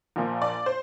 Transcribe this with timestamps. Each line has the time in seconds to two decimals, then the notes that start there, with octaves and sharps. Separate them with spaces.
0.16 A#1 A#2 F3
0.42 D5
0.66 C5